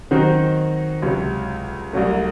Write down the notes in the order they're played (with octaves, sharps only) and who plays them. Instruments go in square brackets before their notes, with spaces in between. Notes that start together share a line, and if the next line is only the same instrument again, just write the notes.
[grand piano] D#3 F#3 C4 D#4 F#4
C#2 C3 F#3
C2 C3 F#3 A3